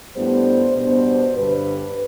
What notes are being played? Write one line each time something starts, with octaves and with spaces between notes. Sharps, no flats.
A2 G3 B3 D4 C5
B2 G3 B3 D4 C5
G2 D3 G3 B4